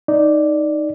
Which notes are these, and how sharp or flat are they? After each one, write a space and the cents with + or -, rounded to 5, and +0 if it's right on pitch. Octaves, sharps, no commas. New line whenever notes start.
D#4 +0 D5 +0